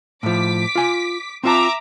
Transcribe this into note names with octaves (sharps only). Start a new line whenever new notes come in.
A2 F3 D6 B6
F4 G#5
C4 F4 E5 A5 A#5 D6